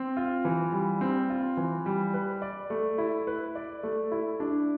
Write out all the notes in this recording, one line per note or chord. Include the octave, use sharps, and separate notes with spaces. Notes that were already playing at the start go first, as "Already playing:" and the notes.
Already playing: C4
F4
E3
G3
C4
F4
E3
G3
B4
D5
A3
E4
B4
D5
A3
E4
D4